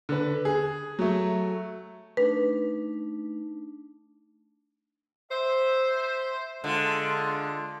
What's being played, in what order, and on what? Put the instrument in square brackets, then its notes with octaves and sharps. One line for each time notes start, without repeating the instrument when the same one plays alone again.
[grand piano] D3 B4
G#4
F#3 A3
[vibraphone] A3 D4 D#4 [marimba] B4
[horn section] C5 E5
[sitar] D3 [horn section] G#3 F4